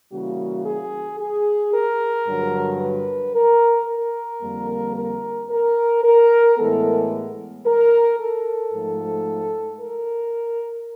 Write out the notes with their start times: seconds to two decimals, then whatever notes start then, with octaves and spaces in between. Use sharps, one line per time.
0.12 C#3 E3 G3 A#3 F#4
0.65 G#4
1.20 G#4
1.74 A#4
2.27 G2 D3 F#3
2.81 B4
3.35 A#4
3.89 A#4
4.42 F2 D3 G3 A#3
4.96 A#4
5.50 A#4
6.04 A#4
6.58 A2 E3 G#3 B3 A4
7.66 A#4
8.19 A4
8.73 G#2 F3 A3
9.81 A#4